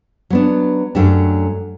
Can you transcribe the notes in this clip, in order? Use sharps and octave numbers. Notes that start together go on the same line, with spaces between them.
F#3 B3 D4
F#2 F#3 A3 D4 G4